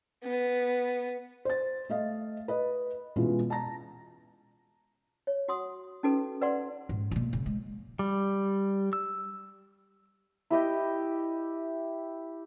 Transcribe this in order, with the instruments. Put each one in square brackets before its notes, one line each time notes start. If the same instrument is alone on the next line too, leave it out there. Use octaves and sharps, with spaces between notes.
[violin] B3
[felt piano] C5 A6
A3 D#5 F5
B4 D#5
B2 E3 G#3 C#4 F4
A5 A#5 A#6
[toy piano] C#5
F#4 F#5 C6 D#6
C#4 D#4 F#4 A4 B4
B4 D5 F#5 C6
[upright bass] G#2
B2 A#3
C#3
G#3
[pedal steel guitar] G3
E6
[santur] E4 G4 D#5 G5